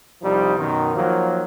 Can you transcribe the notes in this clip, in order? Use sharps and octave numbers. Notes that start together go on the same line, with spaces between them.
C2 F3 G3 D#4
F#2 B2 D#3
D#3 F3 F#3 A#3